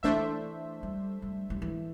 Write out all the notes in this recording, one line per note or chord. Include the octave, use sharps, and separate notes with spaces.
E3 A3 D4 C5 E5
G3
G3
G3
E3